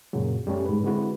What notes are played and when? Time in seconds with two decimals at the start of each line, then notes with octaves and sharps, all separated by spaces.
0.13 F#2 A#2 C#3 F#3
0.46 F#2 G3 A3 C#4
0.66 G#2 B4
0.84 D3 G#3 C4 E4 F#4 B4